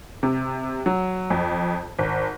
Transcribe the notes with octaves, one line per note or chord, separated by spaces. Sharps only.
C3
F#3
F2
G#1